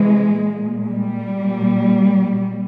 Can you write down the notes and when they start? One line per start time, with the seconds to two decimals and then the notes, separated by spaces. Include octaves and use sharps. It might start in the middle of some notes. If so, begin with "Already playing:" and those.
Already playing: C3 E3 G#3
0.34 A#2
0.86 G3
1.38 A#2